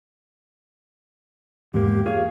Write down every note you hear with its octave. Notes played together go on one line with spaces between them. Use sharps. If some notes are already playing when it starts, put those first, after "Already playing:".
E2 G#2 A#3 G4
F4 G#4 C#5 F5